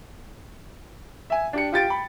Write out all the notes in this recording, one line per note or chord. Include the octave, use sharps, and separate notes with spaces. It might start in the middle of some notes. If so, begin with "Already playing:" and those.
E5 G#5
D4 G4 C#7
F4 G4 A6 D7
G5 B5